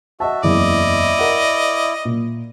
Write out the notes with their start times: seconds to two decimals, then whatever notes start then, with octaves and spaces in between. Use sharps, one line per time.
0.20 F#4 D#5 E5 A5
0.43 F#1 E2 E4 D5 D#5
1.19 A#4 F#5
2.05 A#2